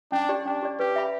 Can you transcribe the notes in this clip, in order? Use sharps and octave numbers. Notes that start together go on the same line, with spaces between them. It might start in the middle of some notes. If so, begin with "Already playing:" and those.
C#4 D4
G4 D5
C#4 D4
G4 D5
G4 B4
E5 B5